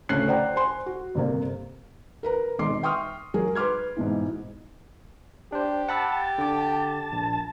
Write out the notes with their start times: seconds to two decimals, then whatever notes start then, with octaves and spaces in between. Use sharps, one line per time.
0.09 D2 C#3 A3 C#4 F#6 C7
0.28 C5 D5 F#5 G5 A#5
0.56 C5 G#5 C6
0.86 F#4
1.15 G1 C3 A#3
2.23 A#4 B4 A#5
2.59 G#1 B2 D#4 C6 D6 C7
2.83 E5 G5 C6 C#6 D#6 F6
3.34 F#3 G#4 A#4
3.55 B4 C6 D6 F6 G#6
3.97 G#2 B2 E3
5.52 D4 G4 C5
5.89 F#5 A5 B5 E6
6.38 D3 D6
7.12 A#1